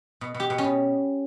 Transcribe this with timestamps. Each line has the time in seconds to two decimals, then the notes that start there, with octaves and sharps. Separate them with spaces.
0.21 B2
0.34 B2
0.40 G4
0.50 B2
0.58 C#4
0.64 B2